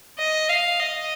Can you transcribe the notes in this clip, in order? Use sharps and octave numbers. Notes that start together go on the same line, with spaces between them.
D#5
F5
D#5